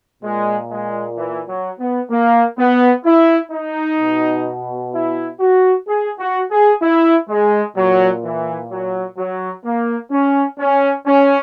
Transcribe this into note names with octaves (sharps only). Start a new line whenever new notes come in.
A#2 G#3
G#3
E3
F#3
B3
A#3
B3
E4
D#4
B2
E4
F#4
G#4
F#4
G#4
E4
G#3
A#2 F#3
E3
F#3
F#3
A#3
C#4
C#4
C#4